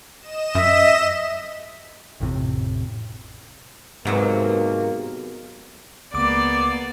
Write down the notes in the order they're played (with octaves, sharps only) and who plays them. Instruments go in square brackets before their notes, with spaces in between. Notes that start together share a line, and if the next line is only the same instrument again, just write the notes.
[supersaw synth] D#5 E7
[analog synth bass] F#2 [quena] E5
[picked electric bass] A1 F2 A2 C3
[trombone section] D#2 A#3 [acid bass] G#2 [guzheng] C3 F#3 B3
[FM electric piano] C#2 D6 [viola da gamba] A#3 B3 D5